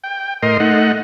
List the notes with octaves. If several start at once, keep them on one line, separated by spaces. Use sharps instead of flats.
G5
A2 A#4 D#5 C6
A3 D#4 F#5